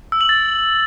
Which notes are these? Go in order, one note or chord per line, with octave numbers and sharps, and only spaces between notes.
E6
F#7
A6